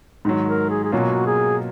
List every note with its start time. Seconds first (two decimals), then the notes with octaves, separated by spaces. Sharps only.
0.25 G#2 D#3 F#3
0.48 A#4
0.70 G#4
0.84 G#4
0.92 B2 F#3 A#3 C#4 F4 F#4
1.26 G#4